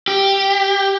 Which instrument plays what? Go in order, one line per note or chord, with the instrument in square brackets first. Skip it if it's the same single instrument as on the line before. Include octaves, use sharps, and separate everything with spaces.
[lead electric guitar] G4